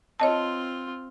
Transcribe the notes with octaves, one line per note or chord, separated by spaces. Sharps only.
C4 F4 C#5 D#5 A5